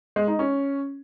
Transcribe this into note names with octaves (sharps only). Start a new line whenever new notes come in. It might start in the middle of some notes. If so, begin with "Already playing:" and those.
G#3
D#4
C#4